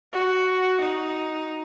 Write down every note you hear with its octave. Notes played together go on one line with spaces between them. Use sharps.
F#4
D#4